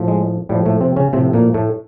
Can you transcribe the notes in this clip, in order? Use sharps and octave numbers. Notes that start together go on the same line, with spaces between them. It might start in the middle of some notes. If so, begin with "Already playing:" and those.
Already playing: A2 F3
G#3
A2 F3 G3
A2 A3
C3 C4
C#3 C#4
A2 C3 F3 C4
A#2 A#3
A2 A3